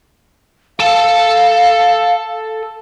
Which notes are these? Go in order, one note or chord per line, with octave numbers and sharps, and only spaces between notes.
A4 F5 A5